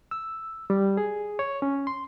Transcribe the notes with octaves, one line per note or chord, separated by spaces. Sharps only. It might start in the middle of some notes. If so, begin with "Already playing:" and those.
E6
G3
G#4
C#5
C#4
C6